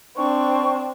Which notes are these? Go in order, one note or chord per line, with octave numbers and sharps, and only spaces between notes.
C4 D4 C#6